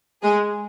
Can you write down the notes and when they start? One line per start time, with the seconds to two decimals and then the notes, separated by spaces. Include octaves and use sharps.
0.22 G#3 G#4